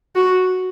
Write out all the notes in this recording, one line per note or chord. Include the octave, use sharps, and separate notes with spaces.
F#4